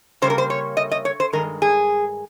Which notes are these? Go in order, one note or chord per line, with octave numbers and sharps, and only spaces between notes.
C#3 G3 A#3 C5
A#4
C5
C#5
D#5
D#5
C#5
C5
G2 D#3 G#3 A#4
G#4